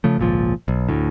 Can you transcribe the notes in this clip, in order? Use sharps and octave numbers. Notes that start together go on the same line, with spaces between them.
C#3 F3 A3
G#1 C#2 A#2 F3
B1
D2 A2